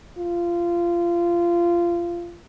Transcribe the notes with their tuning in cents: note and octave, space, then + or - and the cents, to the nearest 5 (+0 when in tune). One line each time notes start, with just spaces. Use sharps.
F4 -20